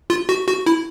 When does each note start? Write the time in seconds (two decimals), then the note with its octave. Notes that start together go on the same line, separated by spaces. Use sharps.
0.10 F4
0.29 F#4
0.48 F#4
0.66 E4